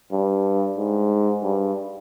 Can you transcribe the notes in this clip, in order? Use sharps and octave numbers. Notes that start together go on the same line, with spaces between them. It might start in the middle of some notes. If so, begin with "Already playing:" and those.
G2
G#2
G2